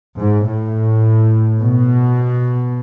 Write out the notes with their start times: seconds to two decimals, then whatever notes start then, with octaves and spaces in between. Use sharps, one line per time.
0.20 G#2
0.48 A2
1.61 B2